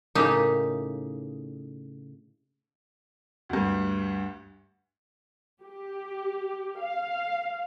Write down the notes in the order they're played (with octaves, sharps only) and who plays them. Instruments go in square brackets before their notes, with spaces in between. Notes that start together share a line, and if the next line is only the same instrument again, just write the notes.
[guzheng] A2 C#3 A#3 D#4 G4
[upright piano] D2 G2
[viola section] G4
F5